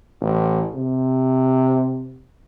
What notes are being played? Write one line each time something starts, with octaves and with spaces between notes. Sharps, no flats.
A1
C3